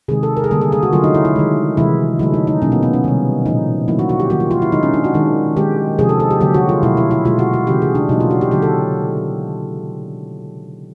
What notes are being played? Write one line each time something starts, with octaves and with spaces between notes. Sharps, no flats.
C3 D#3 G#3 G#4
A4
A#4
G#4
D3 G3 A#3 A4
G#4
G#4
F#4
D3 F#3 A3 F4
D#4
E4
E4
D#3 G#3
C3 E3 G#3 E4
D3 F#3 A3 E4
D#4
D#4
B2 F#3 A#3 C#4
B3
B3
C#4
C3 D#3 G3
A#2 F3 A3 D#4
D#3 F#3 A#3 E4
F#4
F#4
G4
D#3 F#3 A#3 F#4
F4
F4
E4
D#3 G#3 D#4
C#4
D4
F#4
D#3 G#3
D#3 G#3 G4
C3 F3 G#3 G#4
A4
A4
G4
D3 F#3 A#3 G4
F#4
F4
B2 F#3 A3 E4
E4
E4
B2 G#3 F4
F#4
F#4
C#3 E3 A3 G4
G#4
D4
B2 F#3 A#3 D#4
F4
F#4
G4
D3 F#3 A#3 G4
A4